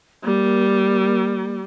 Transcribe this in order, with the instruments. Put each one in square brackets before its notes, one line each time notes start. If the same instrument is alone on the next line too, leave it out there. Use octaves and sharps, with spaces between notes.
[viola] G3 [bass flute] A#3